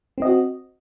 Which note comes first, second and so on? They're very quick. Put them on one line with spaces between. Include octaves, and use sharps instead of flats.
C4 D#5 F#4